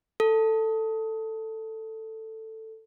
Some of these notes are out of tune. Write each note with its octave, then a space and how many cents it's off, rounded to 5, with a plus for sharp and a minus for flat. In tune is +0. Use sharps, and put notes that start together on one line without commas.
A4 +10